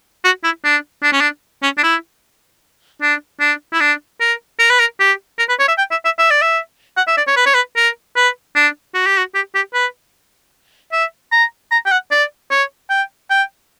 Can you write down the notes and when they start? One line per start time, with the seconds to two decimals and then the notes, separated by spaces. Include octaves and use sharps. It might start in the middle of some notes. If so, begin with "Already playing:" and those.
0.24 F#4
0.44 E4
0.64 D4
1.03 D4
1.12 C#4
1.21 D4
1.63 C#4
1.78 D4
1.83 E4
3.02 D4
3.40 D4
3.73 E4
3.80 D4
4.21 A#4
4.59 A#4
4.70 B4
4.79 A#4
5.00 G4
5.38 A#4
5.49 B4
5.59 C#5
5.68 E5
5.78 G5
5.91 E5
6.05 E5
6.18 E5
6.30 D5
6.42 E5
6.97 F#5
7.07 E5
7.17 D5
7.27 C#5
7.37 B4
7.46 C#5
7.54 B4
7.76 A#4
8.16 B4
8.55 D4
8.94 F#4
9.06 G4
9.18 F#4
9.34 G4
9.55 G4
9.74 B4
10.92 E5
11.32 A#5
11.71 A#5
11.86 G5
11.92 F#5
12.11 D5
12.51 C#5
12.90 G5
13.30 G5